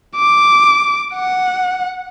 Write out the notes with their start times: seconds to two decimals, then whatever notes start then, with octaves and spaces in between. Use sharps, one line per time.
0.17 D6
1.15 F#5